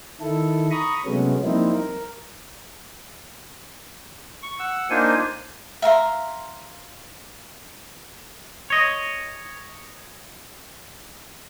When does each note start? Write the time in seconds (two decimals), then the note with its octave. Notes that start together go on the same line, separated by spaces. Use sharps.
0.21 D#3 E4 A4
0.71 A#5 B5 C#6 D#6
1.06 C3 F#3 G#3 A3 B3 C#4
1.44 F3 G3 A#3 C4 D#4 E4
1.74 A#4
4.43 C#6
4.59 F#5 E6
4.90 A#3 D4 D#4 F4 C5 G#5
5.82 E5 F5 A#5 C6
8.70 C#5 D#5